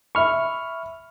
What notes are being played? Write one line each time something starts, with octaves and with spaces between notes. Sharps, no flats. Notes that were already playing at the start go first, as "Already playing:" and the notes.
E5 B5 C#6 F6